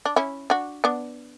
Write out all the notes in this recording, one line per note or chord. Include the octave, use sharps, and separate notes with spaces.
D4
C#4 E4
D4 F#4
B3 D4